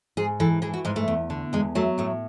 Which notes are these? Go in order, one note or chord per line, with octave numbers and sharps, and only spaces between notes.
G#2 G#4
E3 A4
E3 G#4
F#4
G#2 G#3
A3
E2
D3
E2 G#3
F#3 A3
A2 A3